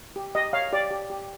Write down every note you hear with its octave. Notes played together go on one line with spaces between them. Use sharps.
G4
G4 D#5
C#5 F5
G4 D5
G4
G4